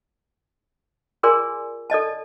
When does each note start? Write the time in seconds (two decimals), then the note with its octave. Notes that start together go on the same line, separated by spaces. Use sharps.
1.23 F4 G#4 A#4 D5 G#5 C6
1.90 A4 D5 D#5 A5